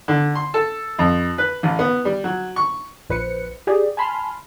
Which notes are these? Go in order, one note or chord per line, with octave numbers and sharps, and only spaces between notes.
D3
C6
A4
F2
B4
A1
B3
G3
F#3
C#6
A#1 B4 C5 C#7
G4 G#4 D5
G#5 A5 B5 C6 F6